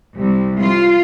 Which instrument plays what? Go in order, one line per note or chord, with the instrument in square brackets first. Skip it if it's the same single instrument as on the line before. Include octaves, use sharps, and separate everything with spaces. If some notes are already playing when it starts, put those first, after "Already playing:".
[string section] C2
F4